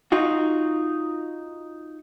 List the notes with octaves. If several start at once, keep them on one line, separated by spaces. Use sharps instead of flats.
D#4 F4 F#4